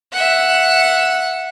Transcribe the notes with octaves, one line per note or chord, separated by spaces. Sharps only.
E5 F#5